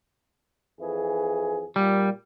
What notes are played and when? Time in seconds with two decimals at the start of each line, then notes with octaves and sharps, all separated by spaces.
0.81 F2 E3 G#4
1.76 A#2 G3